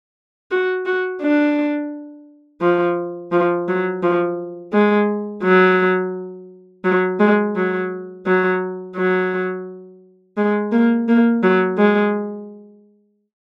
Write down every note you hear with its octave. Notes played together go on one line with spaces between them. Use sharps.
F#4
F#4
D4
F3
F3
F#3
F3
G#3
F#3
F#3
G#3
F#3
F#3
F#3
G#3
A#3
A#3
F#3
G#3